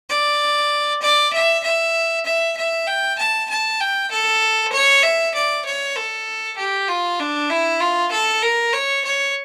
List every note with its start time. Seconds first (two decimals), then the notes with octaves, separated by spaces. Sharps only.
0.10 D5
1.02 D5
1.33 E5
1.64 E5
2.26 E5
2.57 E5
2.87 G5
3.18 A5
3.50 A5
3.81 G5
4.11 A4
4.73 C#5
5.03 E5
5.35 D5
5.65 C#5
5.95 A4
6.57 G4
6.88 F4
7.20 D4
7.50 E4
7.80 F4
8.11 A4
8.43 A#4
8.73 C#5
9.05 C#5